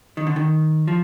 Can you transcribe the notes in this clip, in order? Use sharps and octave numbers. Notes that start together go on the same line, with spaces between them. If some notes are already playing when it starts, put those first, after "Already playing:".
D#3
D3
D#3
F3